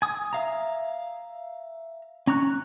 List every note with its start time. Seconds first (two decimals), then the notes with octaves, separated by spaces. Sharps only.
0.02 G#5 D#6
0.33 E5 F5 A#5
2.27 C#4 A#5 C#6 F#6